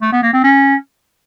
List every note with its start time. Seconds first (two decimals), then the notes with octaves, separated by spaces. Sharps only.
0.02 A3
0.12 B3
0.23 A#3
0.33 C4
0.44 C#4